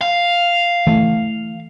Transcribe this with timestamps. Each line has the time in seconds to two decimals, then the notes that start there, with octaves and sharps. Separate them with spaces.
0.01 F5
0.87 E3 A3